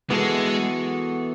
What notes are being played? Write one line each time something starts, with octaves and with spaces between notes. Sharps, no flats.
E3 G#3 B3 F#4 A4